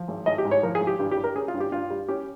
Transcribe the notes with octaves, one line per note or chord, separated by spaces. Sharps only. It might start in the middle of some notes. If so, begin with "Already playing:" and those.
Already playing: F3
G#1
G#1 D#5
G4
G#2
C#5
F3 A#4
G#4
G#1
G4
G2 G4
G4
G3
A#4
C#4 G#4
F4
G2
G4
G2 F4
G3
C#4 G4